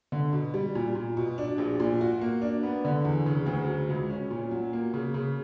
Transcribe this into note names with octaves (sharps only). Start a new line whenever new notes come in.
D3
B2
G3
A#2
A#2
B2
D4
A#1
A#2
F#4
A#3
D4
B3
D3
E2
C#3
D2
F#3
C#2
C#4
A#2
F#3
A#3
C#3
C#3